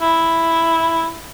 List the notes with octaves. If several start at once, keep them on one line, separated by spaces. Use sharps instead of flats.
E4